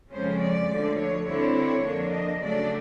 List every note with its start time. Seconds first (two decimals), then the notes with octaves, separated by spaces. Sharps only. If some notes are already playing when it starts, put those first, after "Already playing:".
0.12 F2 C#3 F3 G#3 C#4 C5
0.40 D5
0.69 D2 D3 F3
0.98 C#5
1.26 D3 G3 C4 E4 C#5
1.55 C#5
1.83 F2 D3 F3 A#3 D4
2.12 D#5
2.40 C#3 F#3 A3 D4 D5